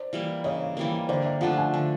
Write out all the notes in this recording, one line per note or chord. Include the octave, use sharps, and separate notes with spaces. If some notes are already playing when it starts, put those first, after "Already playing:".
Already playing: C5 D5
E3 G3 A#3
C#3 C#5 D#5
E3 G3 A#3
D3 C5 D5
D5 E5
F3 A3 D4 E5 F#5
F#5 G#5
D3